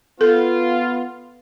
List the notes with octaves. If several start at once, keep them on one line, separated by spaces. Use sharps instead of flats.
B3 F4 A4